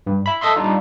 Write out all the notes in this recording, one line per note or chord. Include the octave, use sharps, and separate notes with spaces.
G2
E5 B5
A4 D#5 E5 C6
G3 D4 D#4 F4